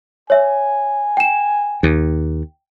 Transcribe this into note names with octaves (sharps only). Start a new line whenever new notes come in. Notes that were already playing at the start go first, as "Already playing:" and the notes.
C#5 E5 G#5
G5 E7
D#2